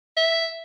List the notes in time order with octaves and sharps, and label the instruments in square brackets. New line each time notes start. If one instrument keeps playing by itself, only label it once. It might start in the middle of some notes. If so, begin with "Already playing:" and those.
[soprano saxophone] E5